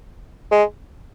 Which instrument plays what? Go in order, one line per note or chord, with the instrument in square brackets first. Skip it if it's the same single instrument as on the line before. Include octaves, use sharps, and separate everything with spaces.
[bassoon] G#3